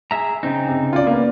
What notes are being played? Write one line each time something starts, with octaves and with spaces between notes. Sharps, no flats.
G#4 E5 A#5
C#3 C4 D#4
C3
F4 D5
A#3 B3